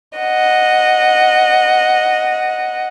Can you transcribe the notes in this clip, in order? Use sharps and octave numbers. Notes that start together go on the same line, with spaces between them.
D#5 F#5